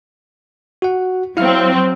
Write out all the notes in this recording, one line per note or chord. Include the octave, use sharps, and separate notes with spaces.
F#4 F#5
F#3 C4 E4 F5 F6